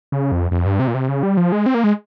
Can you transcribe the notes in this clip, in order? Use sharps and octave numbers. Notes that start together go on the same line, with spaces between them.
C#3
F2
F2
G2
C3
A#2
C3
C#3
G3
F3
G#3
C4
A#3
G#3